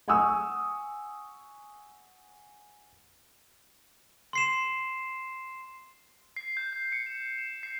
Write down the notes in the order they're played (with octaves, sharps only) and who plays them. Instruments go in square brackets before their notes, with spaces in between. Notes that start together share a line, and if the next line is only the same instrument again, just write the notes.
[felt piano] F#5 G#5 C#6 D#6 E6
[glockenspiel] C6 C7 E7
[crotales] C7
G6
G6
C#7
E7
E7
C7